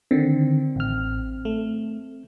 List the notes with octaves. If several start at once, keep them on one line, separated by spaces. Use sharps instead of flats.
D3 D#3 C4
A1 F6
A3